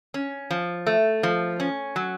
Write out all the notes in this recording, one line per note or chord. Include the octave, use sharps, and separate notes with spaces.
C#4
F3
A3
F3
C#4
F#3